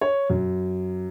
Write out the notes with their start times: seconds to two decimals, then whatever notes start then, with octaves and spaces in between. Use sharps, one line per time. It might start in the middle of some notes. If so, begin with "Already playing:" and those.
0.01 C#5
0.30 F#2